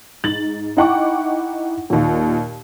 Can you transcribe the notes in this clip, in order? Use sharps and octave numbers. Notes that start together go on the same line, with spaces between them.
G#2 A6 F#7
D#4 E4 F#5 G5 C#6 D6
D#2 A#2